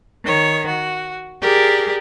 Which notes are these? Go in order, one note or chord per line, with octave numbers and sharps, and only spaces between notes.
D#3 C#5
F#4
G4 G#4 A#4 D5